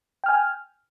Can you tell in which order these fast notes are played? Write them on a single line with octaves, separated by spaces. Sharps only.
G5 F6 G#5